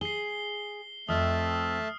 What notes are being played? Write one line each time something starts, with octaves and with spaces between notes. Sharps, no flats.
G#4 C7 G7
F2 A3 C4 E5 A5 D#6 F6